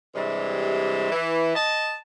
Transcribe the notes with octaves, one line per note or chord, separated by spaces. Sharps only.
G2 C3 E3 G3 G#3
E3
D#5 A5